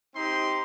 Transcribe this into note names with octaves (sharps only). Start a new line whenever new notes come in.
C4 D#4 G4 C6